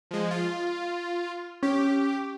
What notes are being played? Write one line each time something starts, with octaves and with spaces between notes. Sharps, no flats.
F3 G#3
F4
C#4 G4